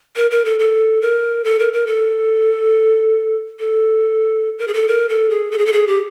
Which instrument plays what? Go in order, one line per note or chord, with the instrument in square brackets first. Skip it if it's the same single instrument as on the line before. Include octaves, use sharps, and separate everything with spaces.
[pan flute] A#4
A#4
A4
A4
A#4
A4
A#4
A#4
A4
A4
A#4
G#4
A4
A#4
A4
G#4
A4
G#4
A4
G#4
G4